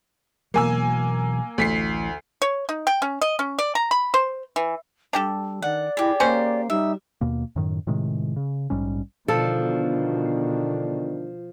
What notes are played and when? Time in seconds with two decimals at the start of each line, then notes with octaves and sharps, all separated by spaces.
0.54 B2 E3 F#3 A#3 G#5 E6
1.58 A1 D2 B6 C7
2.42 C#5
2.69 D#4
2.87 G5
3.02 C#4
3.21 D#5
3.39 C#4
3.59 D5
3.75 A#5
3.91 B5
4.14 C5
4.56 E3
5.13 G3 D4 G4 A4
5.62 D#3 D5 F#5
5.97 E4 G4 G#4
6.20 A#3 C#4 C5
6.70 G3 D#4 E5
7.21 D#2 B2 A#3
7.56 F#2 A2 D#3
7.87 A2 C3 D#3 G#3
8.36 C#3
8.70 A#1 G#2 G3 C#4
9.28 B2 D3 D#3 F3 D4 A4